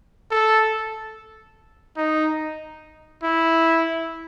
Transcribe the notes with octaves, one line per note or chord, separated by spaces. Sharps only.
A4
D#4
E4